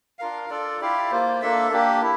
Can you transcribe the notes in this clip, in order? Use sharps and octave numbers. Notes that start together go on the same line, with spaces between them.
D4 F4 A#4 F5
D4 F4 A4 D5
E4 G4 D5 F5
A#3 F4 C5
A#3 D4 A4 E5
A#3 D4 G4
E4